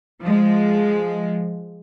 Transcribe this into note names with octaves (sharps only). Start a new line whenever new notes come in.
F3 G#3